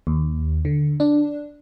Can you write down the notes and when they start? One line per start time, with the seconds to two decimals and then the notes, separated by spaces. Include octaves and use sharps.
0.07 D#2
0.65 D3
1.00 D4